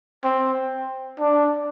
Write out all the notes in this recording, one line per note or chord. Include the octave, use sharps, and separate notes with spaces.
C4
D4